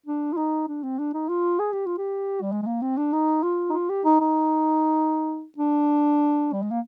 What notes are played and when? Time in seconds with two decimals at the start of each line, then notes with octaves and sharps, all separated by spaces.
0.06 D4
0.33 F4
0.37 D#4
0.68 D4
0.83 C4
0.99 D4
1.14 D#4
1.29 F4
1.59 G#4
1.72 G4
1.86 F4
1.98 G4
2.42 G3
2.52 G#3
2.62 G#3
2.66 A#3
2.82 C4
2.97 D4
3.13 D#4
3.43 F4
3.70 D#4
3.73 F4
3.89 G4
4.05 D#4
4.20 D#4
5.58 D4
6.53 G3
6.62 G#3
6.71 A#3